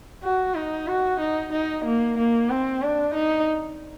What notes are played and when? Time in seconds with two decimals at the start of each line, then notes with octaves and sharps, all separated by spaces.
0.23 F#4
0.55 D#4
0.87 F#4
1.20 D#4
1.52 D#4
1.85 A#3
2.18 A#3
2.50 C4
2.82 D4
3.15 D#4